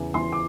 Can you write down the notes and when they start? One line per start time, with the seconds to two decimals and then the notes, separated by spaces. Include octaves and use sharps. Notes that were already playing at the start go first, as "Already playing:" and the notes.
Already playing: E2 C#3 E3
0.14 E3 C6
0.32 D6